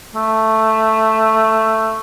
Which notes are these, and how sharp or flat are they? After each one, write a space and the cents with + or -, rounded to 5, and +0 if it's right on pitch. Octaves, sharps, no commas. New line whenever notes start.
A3 +5